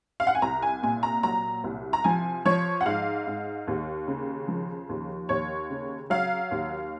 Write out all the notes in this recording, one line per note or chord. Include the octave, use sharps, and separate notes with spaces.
F5
F#5
G#5
C2 A#5
G#5
A#2 G#5
A#5
F#3 A#5
C2
A#5
F3 G#5
F3 C#5
F#5
G#2 F5
G#2
D#2
C#3
F3
D#2
D#2 C#5
C#3
F#3 F5
D#2